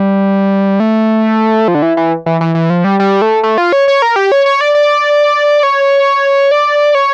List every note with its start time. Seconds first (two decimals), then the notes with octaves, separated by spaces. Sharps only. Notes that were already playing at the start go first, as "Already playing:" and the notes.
Already playing: G3
0.80 A3
1.68 F3
1.75 D3
1.82 E3
1.97 E3
2.26 E3
2.41 E3
2.55 E3
2.70 F3
2.84 G3
3.00 G3
3.22 A3
3.43 A3
3.58 F4
3.72 C#5
3.88 C#5
4.02 A#4
4.16 G4
4.32 C#5
4.46 C#5
4.61 D5
4.75 D5
5.63 C#5
6.51 D5
6.95 C#5